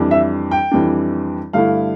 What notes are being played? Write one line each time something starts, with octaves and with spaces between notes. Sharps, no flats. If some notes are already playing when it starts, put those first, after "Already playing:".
Already playing: F2 E3 G3 D4
E5
G5
F2 E3 G3 D4
G2 D3 A3 E4 F5